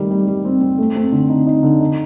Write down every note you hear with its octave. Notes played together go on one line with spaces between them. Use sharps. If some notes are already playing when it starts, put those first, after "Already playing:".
Already playing: D#3 G3 A3
G3
G3
C4
C4
A3
C4
D3
D#4
D#4
D3
D#4